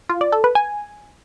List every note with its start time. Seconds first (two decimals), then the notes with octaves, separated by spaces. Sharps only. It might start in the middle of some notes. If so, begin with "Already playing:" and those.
0.09 F4
0.21 D5
0.32 A4
0.44 B4
0.55 G#5